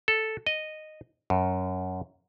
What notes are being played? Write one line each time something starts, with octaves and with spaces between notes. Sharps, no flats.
A4
D#5
F#2